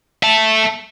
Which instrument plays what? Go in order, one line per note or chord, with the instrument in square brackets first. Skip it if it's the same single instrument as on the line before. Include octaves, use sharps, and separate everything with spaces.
[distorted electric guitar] E5 A5